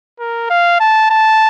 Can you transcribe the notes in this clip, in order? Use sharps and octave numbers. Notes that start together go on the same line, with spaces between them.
A#4
F5
A5
A5